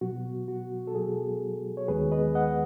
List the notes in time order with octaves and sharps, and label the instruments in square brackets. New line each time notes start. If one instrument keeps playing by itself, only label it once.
[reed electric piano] B2 F#3 B3 F#4
F#4
A4
B2 F#3 B3 G#4
C#5
D#2 D#3 G#3 B3 G#4 B4
B4 D#5
D#5 F#5